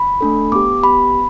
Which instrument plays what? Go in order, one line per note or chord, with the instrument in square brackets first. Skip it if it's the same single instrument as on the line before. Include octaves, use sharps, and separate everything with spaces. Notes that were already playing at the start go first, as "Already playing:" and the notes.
Already playing: [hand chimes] B5
A3 D4 A4
B3 G4 D6
B3 G4 B5